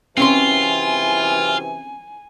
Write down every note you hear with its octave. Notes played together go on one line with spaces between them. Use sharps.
F#2 C3 E3 C4 C#4 F4 G#5 C6